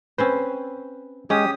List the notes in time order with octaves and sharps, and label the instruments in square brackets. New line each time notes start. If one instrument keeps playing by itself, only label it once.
[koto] C4 C#4 C5 [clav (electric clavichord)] B4
[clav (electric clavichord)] G#3 [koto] C#4 [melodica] G4 D#6